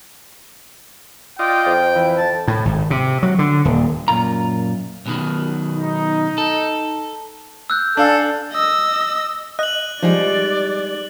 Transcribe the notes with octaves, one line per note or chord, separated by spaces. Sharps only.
F4 D5 D#5 G5
F2
E3
A5
A2
G#1
C3
F#3
D3
D#1
F#2 A#2 F4 A#5
B1 B2 D#3
D#4
A4
E6 F#6 G6
D4 A4 F5 G#5
D#5 E6
D#5 F#6 F#7
F3 G3 G#3 D#4 D5